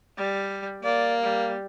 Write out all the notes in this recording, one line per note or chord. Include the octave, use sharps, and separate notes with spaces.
G3
A#3 D5
G3